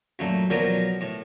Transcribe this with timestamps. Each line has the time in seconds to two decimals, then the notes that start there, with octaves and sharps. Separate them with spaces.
0.19 F#2 A#2 A3
0.50 B2 F3 F#3 A#4 D5
1.01 A2